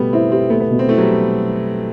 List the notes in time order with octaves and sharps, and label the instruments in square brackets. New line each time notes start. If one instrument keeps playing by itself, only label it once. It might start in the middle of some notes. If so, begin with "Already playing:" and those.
Already playing: [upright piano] B2 A3 [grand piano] G3 B3
[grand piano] C4 [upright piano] E4
[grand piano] C4 [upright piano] G4
[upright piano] A3 [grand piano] B3
[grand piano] B3
[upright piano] B2
[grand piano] C4
[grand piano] A3 [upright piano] E4
[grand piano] F#3
G3